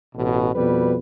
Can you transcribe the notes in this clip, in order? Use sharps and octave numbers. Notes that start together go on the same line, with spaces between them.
A1 B2
F2 B2 G3 B4